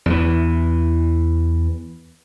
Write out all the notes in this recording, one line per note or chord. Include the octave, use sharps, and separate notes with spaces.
E2 E3